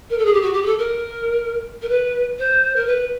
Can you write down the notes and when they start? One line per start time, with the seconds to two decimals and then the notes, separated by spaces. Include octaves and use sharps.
0.09 A#4
0.18 A4
0.25 G#4
0.33 G4
0.42 F#4
0.53 G4
0.62 G#4
0.65 A4
0.78 A#4
1.82 A#4
1.89 B4
2.38 C5
2.75 A#4
2.86 B4